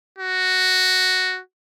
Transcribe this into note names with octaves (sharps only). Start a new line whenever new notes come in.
F#4